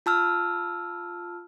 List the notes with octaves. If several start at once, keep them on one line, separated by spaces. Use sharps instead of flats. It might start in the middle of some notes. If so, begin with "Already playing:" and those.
F4 A5 E6 F6